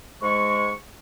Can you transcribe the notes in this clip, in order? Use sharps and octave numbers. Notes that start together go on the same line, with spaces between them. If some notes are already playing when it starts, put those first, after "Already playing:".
G#2 G#3 C#6